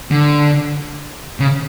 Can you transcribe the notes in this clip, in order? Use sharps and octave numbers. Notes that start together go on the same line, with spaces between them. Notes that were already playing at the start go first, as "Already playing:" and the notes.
D3
C#3